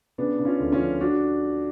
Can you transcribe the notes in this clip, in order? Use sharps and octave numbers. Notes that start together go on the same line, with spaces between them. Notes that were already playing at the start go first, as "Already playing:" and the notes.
C#3 B3 D4
C#3
C#4 F4
D2
C#4 F4
F3
D4 F#4